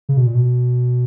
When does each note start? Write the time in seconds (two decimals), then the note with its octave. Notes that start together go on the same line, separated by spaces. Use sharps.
0.09 C#3
0.17 B2
0.27 A#2
0.35 B2